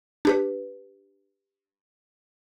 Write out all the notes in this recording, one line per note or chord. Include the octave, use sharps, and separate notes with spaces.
D4 G4 B4